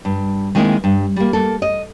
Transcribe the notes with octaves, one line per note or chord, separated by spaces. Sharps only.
G2
D#3 G#3 A#3 C4 E4
G2
G3 A#3
A#3 A4
D#5